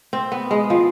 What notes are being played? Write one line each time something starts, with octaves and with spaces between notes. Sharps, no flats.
C4
B3
G#3
F3